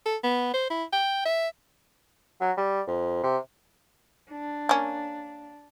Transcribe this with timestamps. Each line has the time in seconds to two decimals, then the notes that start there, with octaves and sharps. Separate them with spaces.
0.06 A4
0.24 B3
0.54 C5
0.70 E4
0.93 G5
1.26 E5
2.41 F#3
2.57 G3
2.87 F2
3.23 C3
4.32 D4
4.69 A#3 C#4